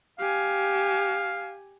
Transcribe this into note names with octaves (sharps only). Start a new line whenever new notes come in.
G4 F5 G#5